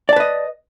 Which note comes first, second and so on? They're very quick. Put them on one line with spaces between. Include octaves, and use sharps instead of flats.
D5 A5 B4 D#5